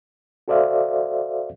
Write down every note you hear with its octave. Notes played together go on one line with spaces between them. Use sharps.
F#4 A4 C5 D5 E5 F5